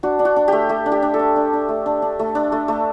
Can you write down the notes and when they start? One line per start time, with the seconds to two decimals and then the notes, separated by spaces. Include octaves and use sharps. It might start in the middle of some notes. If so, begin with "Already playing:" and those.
0.03 D4 F#4
0.19 D4
0.25 F#4
0.36 D4
0.48 A3 G4
0.69 A3
0.86 D4
0.92 G4
1.02 D4
1.14 A4
1.19 D4
1.36 D4
1.53 D4
1.69 A3
1.86 D4
2.02 D4
2.19 A3
2.35 D4
2.52 A3
2.68 A3